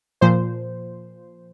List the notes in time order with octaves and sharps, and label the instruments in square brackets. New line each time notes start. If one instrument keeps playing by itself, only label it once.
[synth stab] A#2 F3 C5